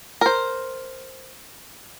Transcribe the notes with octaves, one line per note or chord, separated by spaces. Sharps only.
A#4 C5